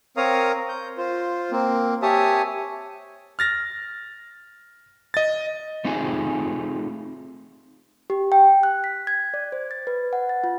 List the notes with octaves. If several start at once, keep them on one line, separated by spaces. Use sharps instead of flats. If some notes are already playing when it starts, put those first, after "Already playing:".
C4 A#4 C#5 F5 A#5 D#6
G6
F4 C5
A#3 C4
G4 C#5 E5 G#5 A5 D#6
F6 A6 A#6
D#5 A6
A3 C4 D#4 F4 G#4 G#5
G4
G5
F#6
B6
G#6
D5
C5
A6
B4
F#5
A6
F4